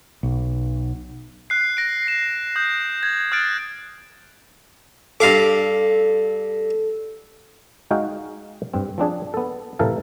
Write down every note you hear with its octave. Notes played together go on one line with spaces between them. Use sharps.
B1
F#6 C7
A#6 D7
C7 E7
D#6 G6
G#6
D#6 F6 F#6 A6 D7
G2 A4 F5 D6
G#3 D#4 F#4 G#4 F5 G5
G2 C4
F3 C4 D4 G#4
B3 A4
A2 C3 E3 A4 A#4 F5